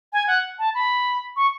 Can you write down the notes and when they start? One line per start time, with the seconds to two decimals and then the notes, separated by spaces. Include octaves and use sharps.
0.13 G#5
0.27 F#5
0.59 A5
0.75 B5
1.36 C#6